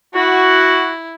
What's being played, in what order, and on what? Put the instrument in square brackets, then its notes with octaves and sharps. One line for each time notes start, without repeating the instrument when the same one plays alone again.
[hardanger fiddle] E4 [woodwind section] F#4